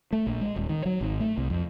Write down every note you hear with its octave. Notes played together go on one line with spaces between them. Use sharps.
A3
A#1
G#3
D#1
D#3
F#3
G#1
A3
C2
F2